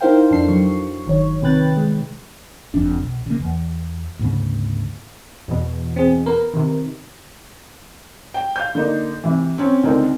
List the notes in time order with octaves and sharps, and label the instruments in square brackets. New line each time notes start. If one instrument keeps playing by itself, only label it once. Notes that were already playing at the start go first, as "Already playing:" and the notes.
[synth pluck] D#4 E4 A#4 C5 F5 G5
F2 D4 A4 C7
F#3 C#6
G1 D#3 C#5
C3 D#3 B4 G5 F#6 A6
G#3
[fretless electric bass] F#1 F2 D4
B1
C#3 A#3
E2
D2 G#2 C#3 B3
[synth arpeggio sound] E2 B2
[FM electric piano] C4 G#4
B3 A#4 B4
[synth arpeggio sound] C3 D#3
[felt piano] G5
F5 G6
D3 A#3 D#4
C3 E3
C4 C#4
C#2 D3 C4 D#4 A#4